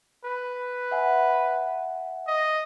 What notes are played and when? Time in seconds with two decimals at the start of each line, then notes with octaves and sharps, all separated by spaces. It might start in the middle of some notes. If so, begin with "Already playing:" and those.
0.25 B4
0.91 E5 F#5 G#5
2.27 D#5